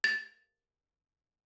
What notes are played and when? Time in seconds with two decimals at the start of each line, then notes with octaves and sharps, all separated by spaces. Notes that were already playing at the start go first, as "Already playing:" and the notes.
0.04 A6